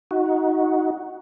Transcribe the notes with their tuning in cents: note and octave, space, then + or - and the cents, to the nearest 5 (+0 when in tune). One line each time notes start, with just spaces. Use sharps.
D#4 +20 F#4 -5